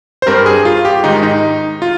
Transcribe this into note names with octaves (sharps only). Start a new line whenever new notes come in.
C5
G2 G3 C4 A#4
G#4
F4
G4
G#2 D#3 G#3 D#4
D#4
F4